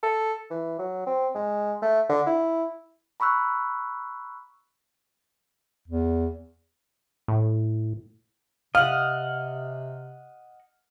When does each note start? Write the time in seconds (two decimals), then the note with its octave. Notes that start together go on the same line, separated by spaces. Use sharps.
0.03 A4
0.50 E3
0.79 F#3
1.06 C4
1.35 G#3
1.82 A3
2.09 D3
2.26 E4
3.20 A#5 B5 C#6 E6 F#6
5.88 E2
7.28 A2
8.75 C3 D#5 F5 F#5 F6